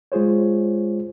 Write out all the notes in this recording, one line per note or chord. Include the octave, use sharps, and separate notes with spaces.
G#3 F4 G#4 C5 C#5